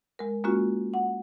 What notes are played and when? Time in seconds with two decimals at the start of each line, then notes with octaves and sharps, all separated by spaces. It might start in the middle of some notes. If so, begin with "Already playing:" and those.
0.19 G#3 A#4
0.44 G#3 A#3 C#4 F4 F#4
0.94 F#5